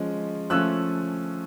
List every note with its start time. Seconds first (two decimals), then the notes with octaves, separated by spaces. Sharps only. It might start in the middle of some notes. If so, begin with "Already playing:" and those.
Already playing: F3 G#3 C#4
0.50 F3 A3 C#4 E6 F#6